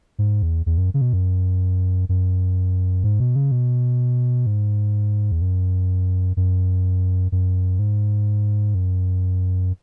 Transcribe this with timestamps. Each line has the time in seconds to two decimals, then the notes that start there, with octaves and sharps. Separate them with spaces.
0.19 G#2
0.42 E2
0.66 E2
0.78 F#2
0.94 C#3
1.01 B2
1.13 F#2
2.09 F#2
3.04 G#2
3.20 B2
3.36 C#3
3.52 B2
4.46 G#2
5.32 E2
5.42 F#2
6.37 F#2
7.32 F#2
7.79 G#2
8.75 F#2